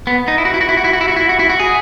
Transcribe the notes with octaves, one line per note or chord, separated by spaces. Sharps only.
B3
D#4
E4
F#4
E4
F#4
E4
F#4
E4
F#4
E4
F#4
E4
F#4
E4
F#4
G#4